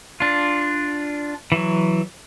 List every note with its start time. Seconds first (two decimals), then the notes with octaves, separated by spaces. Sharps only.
0.20 D4 F4
1.52 E3 F#3